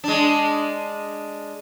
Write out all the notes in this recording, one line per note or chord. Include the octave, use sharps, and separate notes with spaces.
G#3 D4